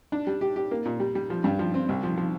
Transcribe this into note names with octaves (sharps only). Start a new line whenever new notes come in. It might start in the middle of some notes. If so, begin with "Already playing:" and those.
D4
G3
G4
G4
A#3
A#2
G3
G3
F3
G2
F3
C4
C2
F3
F3